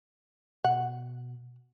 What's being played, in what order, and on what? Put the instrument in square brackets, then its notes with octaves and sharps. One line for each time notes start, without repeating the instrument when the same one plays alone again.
[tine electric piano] B2 [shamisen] F#5